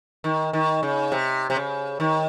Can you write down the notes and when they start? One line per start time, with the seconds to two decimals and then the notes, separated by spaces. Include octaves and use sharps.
0.24 D#3
0.53 D#3
0.83 C#3
1.12 C3
1.50 C3
1.56 C#3
2.00 D#3